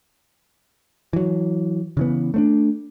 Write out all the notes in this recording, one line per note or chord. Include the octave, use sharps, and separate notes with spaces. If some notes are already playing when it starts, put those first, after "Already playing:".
E3 F#3
C#3 E3 B3
A3 C4 D4